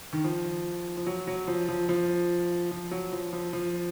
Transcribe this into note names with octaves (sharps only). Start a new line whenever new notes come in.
D#3
F3
F3
F#3
F#3
F3
F3
F3
F3
F#3
F3
F3
F3